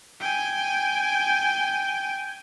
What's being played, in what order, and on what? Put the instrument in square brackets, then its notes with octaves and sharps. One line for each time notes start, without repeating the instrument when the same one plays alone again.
[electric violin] G5 G#5